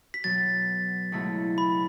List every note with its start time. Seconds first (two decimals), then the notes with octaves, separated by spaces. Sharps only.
0.14 B6
0.24 B2 F#3 B3 A6
1.12 C#2 B2 F#3 A3 E4
1.58 B5